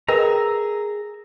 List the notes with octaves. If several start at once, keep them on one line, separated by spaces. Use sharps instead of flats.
G#4 A#4 B4 D#5 G5 A#5 E6